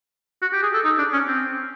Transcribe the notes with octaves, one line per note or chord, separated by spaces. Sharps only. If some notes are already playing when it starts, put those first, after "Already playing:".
F#4
G4
G#4
A4
D#4
D4
C#4
C4